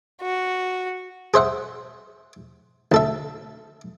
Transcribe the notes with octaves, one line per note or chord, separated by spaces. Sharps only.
F#4
G#4 C5 E5 F#5
D2 A4 E5